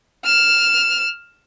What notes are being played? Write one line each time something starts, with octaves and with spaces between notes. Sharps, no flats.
F6 E7